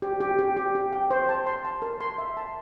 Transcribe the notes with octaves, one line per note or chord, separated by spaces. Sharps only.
G4
G4
G4
G4
G4
G5
C5
A5
C6
A5
A#4
C6
E5
A5